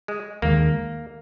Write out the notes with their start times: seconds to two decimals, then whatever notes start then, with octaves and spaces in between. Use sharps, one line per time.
0.08 G#3
0.42 D#2 D#3 G#3 A#3